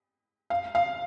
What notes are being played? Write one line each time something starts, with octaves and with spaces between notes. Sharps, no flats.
F5
F5